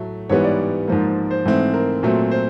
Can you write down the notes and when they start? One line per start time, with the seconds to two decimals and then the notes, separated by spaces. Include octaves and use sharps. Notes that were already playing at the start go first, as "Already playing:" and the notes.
Already playing: A2 F#3 A3
0.29 G#2 E3 G3 B3 C#5
0.44 D5
0.88 G#2 F3 A#3
1.31 C5
1.45 G#2 E3 A3 C4
1.74 A#4
2.03 A#2 F#3 A3 C4
2.31 C5